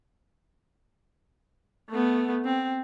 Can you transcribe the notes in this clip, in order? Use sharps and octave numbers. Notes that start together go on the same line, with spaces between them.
A3 B3
C4